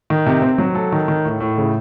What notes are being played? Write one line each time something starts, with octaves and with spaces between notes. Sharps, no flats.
D#3
C3
C4
F#3
A4
D#3
D#3
A2
A2
C#3